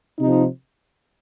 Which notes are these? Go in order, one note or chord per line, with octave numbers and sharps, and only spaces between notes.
C3 F3 D#4